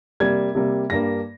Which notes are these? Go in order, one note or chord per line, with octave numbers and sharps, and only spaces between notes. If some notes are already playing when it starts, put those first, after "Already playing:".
C3 G3 A#3 G#6
C3 G3 A#3
G2 G3 A#3 A#6